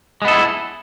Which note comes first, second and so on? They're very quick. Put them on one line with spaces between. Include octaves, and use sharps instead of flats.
G#3 B3 A4 E4